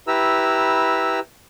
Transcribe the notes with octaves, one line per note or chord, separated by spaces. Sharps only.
E4 G4 B4 A#5 E6